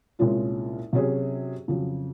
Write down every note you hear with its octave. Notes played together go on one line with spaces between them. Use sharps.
C2 A#2 G#3 C#4 F4
C3 F#3 C#4 G#4
F2 C#3 F#3